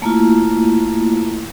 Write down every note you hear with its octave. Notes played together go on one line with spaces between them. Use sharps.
A3 A#3 E4 F4